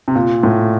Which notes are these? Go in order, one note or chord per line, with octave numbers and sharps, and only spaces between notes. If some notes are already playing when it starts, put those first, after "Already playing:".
C3
A#2
A2